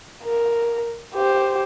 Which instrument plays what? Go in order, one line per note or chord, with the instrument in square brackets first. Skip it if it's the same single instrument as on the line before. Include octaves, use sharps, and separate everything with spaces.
[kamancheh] A#4
G4 C5